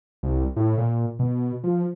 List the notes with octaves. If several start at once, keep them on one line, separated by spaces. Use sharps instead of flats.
C2
A2
A#2
B2
F3